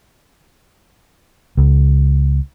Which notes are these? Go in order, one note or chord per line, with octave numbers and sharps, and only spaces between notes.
C#2